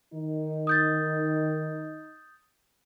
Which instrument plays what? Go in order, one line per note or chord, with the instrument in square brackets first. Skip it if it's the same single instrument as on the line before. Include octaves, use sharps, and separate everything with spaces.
[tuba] D#3 [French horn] D#4
[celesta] D#6 G6 A6